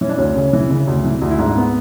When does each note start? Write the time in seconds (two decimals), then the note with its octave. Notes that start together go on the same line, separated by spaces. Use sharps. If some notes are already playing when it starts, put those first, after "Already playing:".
0.01 E3 C#4
0.09 D4
0.17 D2 C#4
0.36 C#3
0.53 E3
0.71 C#3
0.87 D2
1.04 E3
1.22 D2
1.31 E4
1.39 G#2 D4
1.57 B3